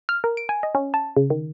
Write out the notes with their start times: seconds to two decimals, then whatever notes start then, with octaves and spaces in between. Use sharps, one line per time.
0.09 F6
0.24 A#4
0.37 D7
0.49 G#5
0.63 D#5
0.75 C#4
0.94 A5
1.17 C#3
1.30 D#3